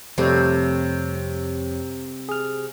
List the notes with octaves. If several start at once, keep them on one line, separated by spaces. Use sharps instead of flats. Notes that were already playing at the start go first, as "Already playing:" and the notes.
F2 C3 G3 A3 C#5
G#4 F6